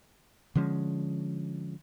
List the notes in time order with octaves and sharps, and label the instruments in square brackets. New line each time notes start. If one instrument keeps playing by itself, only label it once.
[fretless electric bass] D3 F3 G#3 C#4